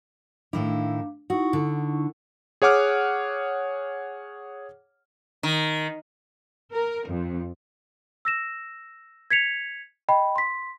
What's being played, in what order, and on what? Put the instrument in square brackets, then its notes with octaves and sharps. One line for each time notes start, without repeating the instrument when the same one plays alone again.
[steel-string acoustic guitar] A2 D#3 E4 [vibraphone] D4 F5
[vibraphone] D#4 E4 C#6 [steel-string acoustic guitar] F#4
[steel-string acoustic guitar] D3
[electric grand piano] G#4 C#5 F#5 D6 F6
[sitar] D#3
[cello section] A#4
F2
[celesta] E6 A#6 E7
G#6 B6 C#7 F7
D#5 G5 B5
C6 B6